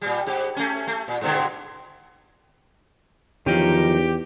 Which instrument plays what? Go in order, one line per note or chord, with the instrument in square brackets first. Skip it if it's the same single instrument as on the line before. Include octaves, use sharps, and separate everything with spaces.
[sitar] A#2 G3
G#2 G4
A3 C#4
A3
A#2
G2 B2 D3
[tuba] E2 [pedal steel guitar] D#3 D#4 [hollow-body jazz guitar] F3 C#4 [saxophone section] G4